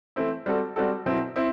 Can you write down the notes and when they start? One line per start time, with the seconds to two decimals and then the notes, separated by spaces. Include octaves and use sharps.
0.16 E3 A3 C4 E4
0.46 G3 C4 F#4 A4
0.76 G3 C4 F#4 A4
1.06 B2 F#3 C4 E4
1.36 C4 E4